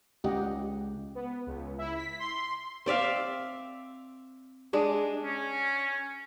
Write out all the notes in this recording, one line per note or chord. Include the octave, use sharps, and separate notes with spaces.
C#2 G4 D#5 F#5
B3
C#2
E4
B6
C6
C4 D5 E5 F5
G#3 D4 G#4
C#4